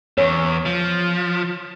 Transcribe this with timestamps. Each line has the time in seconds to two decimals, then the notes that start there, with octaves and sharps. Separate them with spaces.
0.18 E2 C#5
0.66 F3